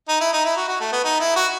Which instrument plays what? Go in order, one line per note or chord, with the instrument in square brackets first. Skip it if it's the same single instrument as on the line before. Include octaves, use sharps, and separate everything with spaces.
[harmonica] D#4
E4
D#4
E4
F#4
F#4
A3
B3
D#4
E4
F#4